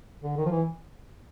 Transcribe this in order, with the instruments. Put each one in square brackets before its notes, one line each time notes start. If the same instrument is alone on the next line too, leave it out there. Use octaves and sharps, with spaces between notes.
[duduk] D3
D#3
F3
E3